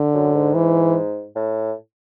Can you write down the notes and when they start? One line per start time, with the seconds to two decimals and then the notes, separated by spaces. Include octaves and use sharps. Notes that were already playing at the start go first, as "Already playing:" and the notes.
Already playing: D3
0.14 F#2
0.34 G#2
0.54 E3
1.36 A2